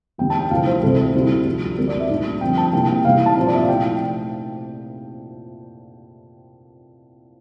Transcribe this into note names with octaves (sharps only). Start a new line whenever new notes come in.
E2 D3 G3 G5
A5
G5
D2 C3 F3 A3 E4 F5
C5
C2 C3 E3 A4
D2 C3 G3 C4 E4
D2 D3 F3
G2 D3 G3 C4 A#4
D5
E5
C2 A#2 A3 D4
F2 D3 F3 C4 G5
A5
C3 G3 A#3 E4 G5
G5
C3 E3 G3 F5
A5
A#2 F3 C4 E4 C5
D5
E5
F5
C3 F3 A3 E4 G5
G5